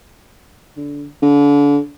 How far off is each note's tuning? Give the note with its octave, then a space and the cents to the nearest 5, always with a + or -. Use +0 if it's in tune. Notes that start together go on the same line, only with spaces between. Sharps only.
D3 -20
D3 -35